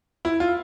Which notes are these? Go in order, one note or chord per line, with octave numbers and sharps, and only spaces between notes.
E4
F4